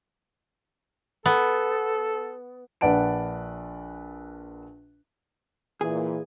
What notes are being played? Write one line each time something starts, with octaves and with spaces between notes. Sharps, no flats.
B3 A4
A#1 B4 D5 F#5 A5 D7
A#2 E3 G#4